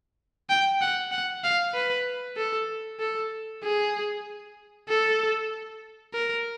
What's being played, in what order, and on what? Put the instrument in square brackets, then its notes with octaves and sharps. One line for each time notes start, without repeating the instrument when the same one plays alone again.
[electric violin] G5
F#5
F#5
F5
B4
A4
A4
G#4
A4
A#4